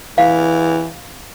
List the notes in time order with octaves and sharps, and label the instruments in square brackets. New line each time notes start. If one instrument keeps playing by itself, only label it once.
[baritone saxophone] E3 [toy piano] F5